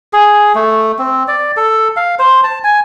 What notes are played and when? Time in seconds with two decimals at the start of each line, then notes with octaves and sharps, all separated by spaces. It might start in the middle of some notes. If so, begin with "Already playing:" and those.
0.13 G#4
0.55 A3
0.98 C4
1.28 D5
1.57 A4
1.97 F5
2.19 C5
2.44 A5
2.64 G#5